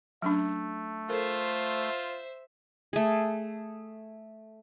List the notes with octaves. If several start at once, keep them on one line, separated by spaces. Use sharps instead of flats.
F#3 A3 C#4 D4
F4 A4 A#4 C5 E5
A3 G#4